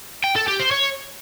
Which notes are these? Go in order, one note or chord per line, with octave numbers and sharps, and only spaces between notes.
G5
A4
G4
C5
C#5